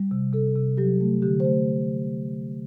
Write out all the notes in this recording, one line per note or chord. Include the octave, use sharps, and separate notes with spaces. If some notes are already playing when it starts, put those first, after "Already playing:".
Already playing: G3
C3
C3 A4
C3
F#3 G4
A3
D3 G4
A3 C5